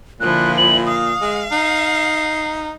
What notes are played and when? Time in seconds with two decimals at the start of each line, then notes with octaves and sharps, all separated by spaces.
0.20 A#2 D3 F3 E4 F#6
0.57 F#7
0.86 F5 D#6
1.21 G#3
1.52 D#4 C7